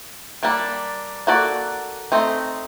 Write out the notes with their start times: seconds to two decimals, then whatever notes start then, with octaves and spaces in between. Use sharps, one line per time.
0.43 G3 A#3 D4
1.27 A#3 F#4 A4 D5
2.12 A3 C4 D#4